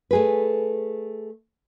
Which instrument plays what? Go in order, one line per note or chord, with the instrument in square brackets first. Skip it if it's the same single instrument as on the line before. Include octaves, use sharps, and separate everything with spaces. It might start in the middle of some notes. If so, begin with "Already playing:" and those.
[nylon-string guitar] A3 G#4 B4